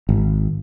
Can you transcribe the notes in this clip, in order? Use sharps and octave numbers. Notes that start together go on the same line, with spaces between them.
G#1